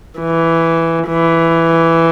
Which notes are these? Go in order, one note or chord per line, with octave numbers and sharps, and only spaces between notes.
E3
E3